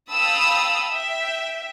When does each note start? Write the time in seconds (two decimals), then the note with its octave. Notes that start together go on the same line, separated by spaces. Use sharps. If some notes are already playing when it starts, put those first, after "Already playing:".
0.10 F5 G5 A5 B5 D#6 E6
0.91 E5 G5